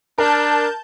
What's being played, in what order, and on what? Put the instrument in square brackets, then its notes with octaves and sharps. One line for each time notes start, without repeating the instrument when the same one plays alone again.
[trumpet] D4 [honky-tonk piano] A#4 [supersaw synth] A5 G6